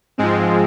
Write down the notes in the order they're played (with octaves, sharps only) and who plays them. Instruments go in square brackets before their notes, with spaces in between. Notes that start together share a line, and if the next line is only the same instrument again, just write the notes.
[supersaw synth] G#2 F3 G#3 C4